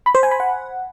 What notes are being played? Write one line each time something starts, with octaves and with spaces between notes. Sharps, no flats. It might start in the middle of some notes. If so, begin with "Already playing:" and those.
B5
C5
G#5
B5
F#5